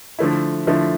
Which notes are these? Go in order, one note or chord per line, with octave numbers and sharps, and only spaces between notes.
D3 F3 A3 E4
D3 F3 A3 E4